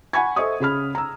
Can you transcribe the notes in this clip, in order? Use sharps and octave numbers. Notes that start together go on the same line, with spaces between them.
F#5 G#5 B5 C#6 G#6
A4 C5 D#5 E5 C#6 D#6
C#3 G#4 B5 F6
A#5 E6